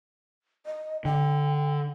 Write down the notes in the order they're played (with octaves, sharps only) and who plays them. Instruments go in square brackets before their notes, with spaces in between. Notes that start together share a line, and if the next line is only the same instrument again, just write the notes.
[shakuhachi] D#5
[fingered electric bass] D3 [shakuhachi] G5